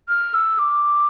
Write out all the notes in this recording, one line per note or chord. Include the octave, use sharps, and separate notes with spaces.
F6
E6
D6